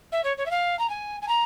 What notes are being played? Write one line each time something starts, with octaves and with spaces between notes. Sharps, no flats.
E5
C#5
C#5
E5
F5
A#5
G#5
G#5
A#5